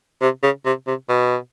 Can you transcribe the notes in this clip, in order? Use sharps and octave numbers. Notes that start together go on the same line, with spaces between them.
C3
C#3
C3
C3
B2